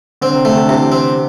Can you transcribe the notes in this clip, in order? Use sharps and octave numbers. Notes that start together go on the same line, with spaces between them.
D3 C4
C3
D3 A3
C3
D3
C3 E3
C4